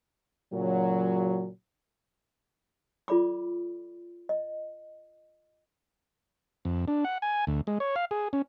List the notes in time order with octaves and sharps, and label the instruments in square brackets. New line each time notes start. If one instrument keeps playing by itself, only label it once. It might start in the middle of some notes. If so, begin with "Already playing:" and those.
[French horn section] A#2 C#3 F#3
[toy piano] F4 A4 D5 B5 D6
D#5
[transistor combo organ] F2
D4
F#5
G#5
D2
G#3
C#5
F5
G#4
C#4